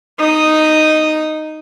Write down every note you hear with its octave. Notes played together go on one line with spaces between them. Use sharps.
D#4 D#6